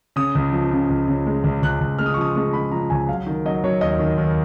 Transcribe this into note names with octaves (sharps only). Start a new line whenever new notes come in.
C#3 D#6
C#2
F3
C#3
C#2
C#3
G#3
C#2
C#2 F#6
C#2
G#3 F6
D#6
C#6
F3 D#6
G#3 C#6
G#3 B5
F3 A#5
C#2 G#5
F#3 F5
D#3
F#3 D#5
F#3 C#5
D#2 D#5
D#3
D#2